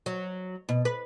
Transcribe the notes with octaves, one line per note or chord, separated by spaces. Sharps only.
F#3
B2
B4